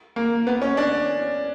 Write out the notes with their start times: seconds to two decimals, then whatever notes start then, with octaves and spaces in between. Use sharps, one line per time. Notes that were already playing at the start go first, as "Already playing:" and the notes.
0.16 A#3
0.47 B3
0.62 C#4
0.77 D4